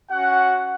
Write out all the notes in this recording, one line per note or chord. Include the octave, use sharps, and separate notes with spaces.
C#4 F#4 F#5